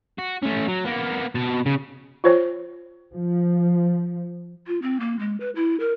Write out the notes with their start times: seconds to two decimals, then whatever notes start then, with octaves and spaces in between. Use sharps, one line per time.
0.18 F#4
0.43 A3 C#4
0.68 F#3
0.85 A#3 B3
1.35 B2 A5
1.66 C#3
2.24 F4 C5 C#5
3.13 F3
4.67 F4
4.82 C4
5.00 A#3
5.19 G#3
5.40 B4
5.56 E4
5.80 A#4